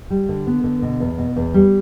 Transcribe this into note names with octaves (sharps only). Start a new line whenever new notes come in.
G3
D3
B3
D3
B2
E2
B2
E2
G3